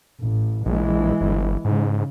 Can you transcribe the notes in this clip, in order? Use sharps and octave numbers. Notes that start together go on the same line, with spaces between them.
A1
A#1 E3 G#3
G1
G#2 C#3